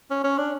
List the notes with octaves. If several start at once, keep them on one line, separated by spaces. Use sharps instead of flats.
C#4
C#4
D4